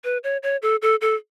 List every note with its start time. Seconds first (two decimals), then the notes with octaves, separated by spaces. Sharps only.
0.04 B4
0.24 C#5
0.43 C#5
0.62 A4
0.82 A4
1.01 A4